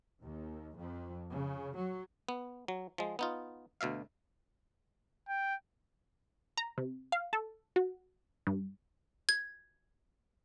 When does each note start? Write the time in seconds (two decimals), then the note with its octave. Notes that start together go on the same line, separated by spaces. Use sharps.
0.22 D#2
0.78 F2
1.32 C#3
1.74 F#3
2.29 B3
2.68 F#3
2.98 F3 G#3
3.19 B3 D#4 F4
3.81 D2 B2 E5 F5
5.29 G5
6.57 A#5
6.78 C3
7.12 F5
7.33 A4
7.76 F#4
8.47 G2
9.29 G#6